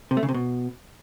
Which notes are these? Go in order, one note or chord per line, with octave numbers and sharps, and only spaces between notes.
C3
A3
C#3
C3
B2